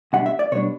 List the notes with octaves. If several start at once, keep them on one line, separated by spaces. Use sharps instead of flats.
B2 G3 D4 F#5
E5
D5
B2 G3 D4 C#5